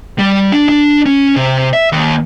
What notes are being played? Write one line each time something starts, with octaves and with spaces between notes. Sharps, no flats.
G3
D4
D4
C#4
C3
E5
D#2